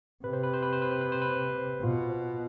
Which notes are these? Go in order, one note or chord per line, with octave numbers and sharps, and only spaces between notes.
C3 B4
C5
B4
C5
B4
C5
B4
C5
B4
C5
B4
B2 F4
C5